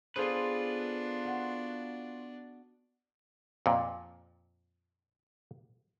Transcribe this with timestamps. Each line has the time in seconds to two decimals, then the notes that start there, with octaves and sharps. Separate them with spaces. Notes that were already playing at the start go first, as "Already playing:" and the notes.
0.16 B3 D4 F4 G#4 A4 B4 C5
1.25 F#4 F#5 C6
3.66 F2 A#2